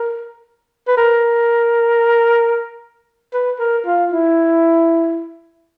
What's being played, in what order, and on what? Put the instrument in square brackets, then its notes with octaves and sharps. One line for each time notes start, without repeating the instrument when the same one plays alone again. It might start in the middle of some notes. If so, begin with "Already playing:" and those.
Already playing: [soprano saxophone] A#4
B4
A#4
B4
A#4
F4
E4